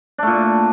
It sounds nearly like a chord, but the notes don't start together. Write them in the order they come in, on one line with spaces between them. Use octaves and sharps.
D4 A3 A#2